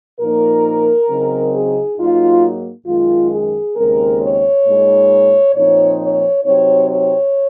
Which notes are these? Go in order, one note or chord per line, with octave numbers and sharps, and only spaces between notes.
A#2 F3 A#3 D#4 A#4
C#3 F#3 C4 D#4
G#4
G#2 F#3 A#3 D#4 F4
F#2 D#3 G#3 F4
G#4
D#2 C#3 G#3 C4 A#4
C#5
A#2 G#3 D#4
A#2 F3 C4 D#4 C#5
C#5
C3 F#3 C4 D#4 C#5
C#5